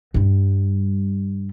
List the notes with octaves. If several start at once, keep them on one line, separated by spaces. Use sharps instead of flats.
G2 G3